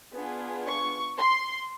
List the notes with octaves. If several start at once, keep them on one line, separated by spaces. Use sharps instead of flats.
B3 D4 F4 G#4
C#6
C6